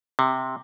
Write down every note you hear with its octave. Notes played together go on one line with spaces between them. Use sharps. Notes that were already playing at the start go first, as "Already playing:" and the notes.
C3